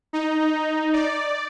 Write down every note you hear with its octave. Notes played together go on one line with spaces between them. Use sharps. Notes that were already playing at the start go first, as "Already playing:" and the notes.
D#4
D5